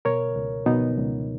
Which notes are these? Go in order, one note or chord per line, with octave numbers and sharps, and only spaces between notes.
B2 A#4 C#5
C#2
B2 B3 D#4
C#2